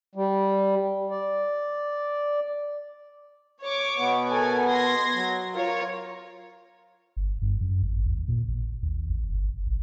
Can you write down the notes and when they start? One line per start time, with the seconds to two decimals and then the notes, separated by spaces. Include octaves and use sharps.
0.15 G3
1.10 D5
3.63 C#5 C#6 D6
3.97 B2 B3
4.28 A4 A#4 G#5
4.69 C6 G#6 A#6
5.14 F#3
5.52 F4 A#4 C#5
7.17 G1
7.42 G2
7.61 F#2
7.83 G#1
8.06 D#2
8.28 A#2
8.48 A1
8.83 D#2
9.10 A1
9.29 G1
9.67 A#1